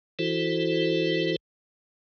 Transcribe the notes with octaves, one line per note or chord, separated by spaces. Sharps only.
E3 E4 F#4 A4 C5